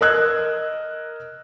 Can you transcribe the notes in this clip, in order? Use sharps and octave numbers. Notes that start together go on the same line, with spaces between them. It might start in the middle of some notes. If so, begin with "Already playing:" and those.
A#4 D#5 E6 F#6 G#6